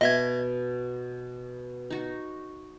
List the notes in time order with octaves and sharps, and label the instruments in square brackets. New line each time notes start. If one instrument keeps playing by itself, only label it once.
[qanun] B2 [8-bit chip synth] D#5 E5 G#6
[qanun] D#4 F#4